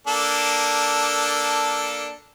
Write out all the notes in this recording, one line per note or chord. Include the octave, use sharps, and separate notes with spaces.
A#3 D4 A4